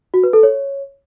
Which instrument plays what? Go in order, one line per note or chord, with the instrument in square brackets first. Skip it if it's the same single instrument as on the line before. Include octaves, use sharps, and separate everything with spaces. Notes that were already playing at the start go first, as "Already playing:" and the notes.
[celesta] F#4
B4
A4
C#5